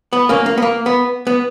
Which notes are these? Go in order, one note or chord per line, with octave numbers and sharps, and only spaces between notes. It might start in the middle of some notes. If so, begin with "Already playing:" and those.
B3
A#3 C#4
A#3
B3
A#3
B3
B3